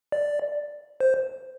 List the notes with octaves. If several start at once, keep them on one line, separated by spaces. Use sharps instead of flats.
D5
C5